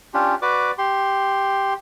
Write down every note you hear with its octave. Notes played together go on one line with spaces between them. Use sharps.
C#4 D4 F4 G4
F#4 B4 D5 D6
G4 C6